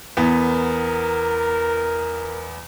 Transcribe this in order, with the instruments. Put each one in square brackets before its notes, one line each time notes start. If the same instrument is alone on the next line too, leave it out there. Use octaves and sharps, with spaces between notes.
[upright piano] E2 B3 [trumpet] A#4